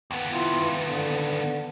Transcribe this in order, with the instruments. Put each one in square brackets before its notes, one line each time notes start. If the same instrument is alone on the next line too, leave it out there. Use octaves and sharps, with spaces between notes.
[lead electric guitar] D#2 B3
[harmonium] E4 F4
D3